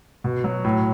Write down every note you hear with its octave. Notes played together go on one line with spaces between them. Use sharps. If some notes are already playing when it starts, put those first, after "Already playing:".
B2
F#3
A2